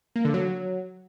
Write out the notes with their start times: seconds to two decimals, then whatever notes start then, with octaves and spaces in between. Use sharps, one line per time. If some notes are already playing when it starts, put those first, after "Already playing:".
0.16 A#3
0.25 D3
0.34 F#3